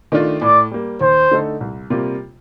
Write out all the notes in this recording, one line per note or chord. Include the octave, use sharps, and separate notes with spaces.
D#3 A3 D4 F4
A2 D5
G3 A#3
D#2 C5
D3 A3 D#4 A4
C2
C3 G3 A#3 F4